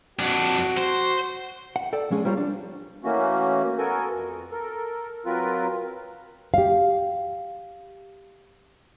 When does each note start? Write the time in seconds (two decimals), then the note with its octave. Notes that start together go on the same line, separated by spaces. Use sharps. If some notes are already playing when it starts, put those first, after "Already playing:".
0.19 F2 D4 F#4
0.77 C5
1.76 F#5
1.93 A4 D5 G5
2.10 F3 G#3 C#4 G#4
2.25 G3 A#3 F4 C5 C#5
2.37 D4
3.04 E3 A3 A#3 C#4 F#4
3.78 B3 F#4 A4 A#4 G#5
4.12 F2
4.51 A4 A#4
5.25 F#3 C4 F4 A#4 B4
6.54 G4 F5